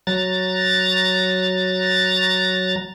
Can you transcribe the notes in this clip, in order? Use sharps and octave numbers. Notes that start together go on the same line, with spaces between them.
F#3 A#5 A6